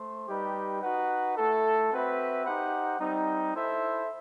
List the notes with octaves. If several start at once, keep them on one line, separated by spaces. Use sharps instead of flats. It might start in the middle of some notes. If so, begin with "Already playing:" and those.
Already playing: A3 C5
G3 D#4 G4 B4
D#4 F#4 B4 F#5
A3 E4 A4
C4 F#4 B4 E5
D#4 G4 C5 F#5
G3 C4 D#4
E4 A4 C5 E5